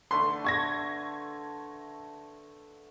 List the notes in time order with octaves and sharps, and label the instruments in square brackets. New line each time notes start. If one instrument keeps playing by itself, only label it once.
[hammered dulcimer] D3 A3 B4 [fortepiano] C6
[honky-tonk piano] C#6 G#6 A#6